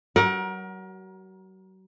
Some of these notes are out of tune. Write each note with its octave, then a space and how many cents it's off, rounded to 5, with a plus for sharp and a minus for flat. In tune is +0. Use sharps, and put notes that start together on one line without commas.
F#3 +35 A#4 +30 F#5 +0